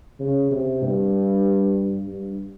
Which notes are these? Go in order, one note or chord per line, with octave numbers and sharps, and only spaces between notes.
C#3
C3
G2
G2